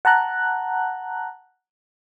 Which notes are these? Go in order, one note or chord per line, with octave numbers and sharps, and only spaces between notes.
F#5 A5 A#5 F#6